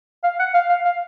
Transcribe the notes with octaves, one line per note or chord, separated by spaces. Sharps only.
F5
F#5
F5
F5
F5